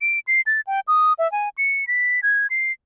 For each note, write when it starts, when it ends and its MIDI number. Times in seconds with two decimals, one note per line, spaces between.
0.01 0.19 98
0.27 0.41 96
0.47 0.61 93
0.67 0.80 79
0.88 1.13 87
1.19 1.30 76
1.32 1.49 80
1.58 1.87 97
1.87 2.20 95
2.23 2.47 92
2.50 2.72 96